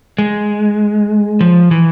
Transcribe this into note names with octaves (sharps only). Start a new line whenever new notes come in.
G#3
F3
E3